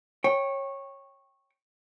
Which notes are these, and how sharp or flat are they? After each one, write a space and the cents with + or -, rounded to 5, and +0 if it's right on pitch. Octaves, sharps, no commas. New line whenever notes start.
C#5 -15 G5 +0